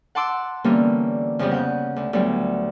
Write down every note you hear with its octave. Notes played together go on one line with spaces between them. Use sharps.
F#5 A5 C6 D6 E6
D3 E3 G3 A#3 B3 C#4
F2 C#3 F3 G3 B3
F#5 G6
D2
D2 F#3 G3 B3